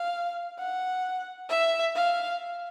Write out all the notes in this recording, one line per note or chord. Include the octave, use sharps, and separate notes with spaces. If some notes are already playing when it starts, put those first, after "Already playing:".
Already playing: F5
F#5
E5
F5